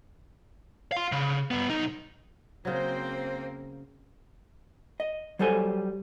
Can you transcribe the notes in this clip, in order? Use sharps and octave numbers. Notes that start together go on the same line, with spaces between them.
F5 C6
C#3
G2 B3
B1 D#4
C#3 F#3 A#3 C4 C5
D#5
F#3 G3 A4 C5 G#5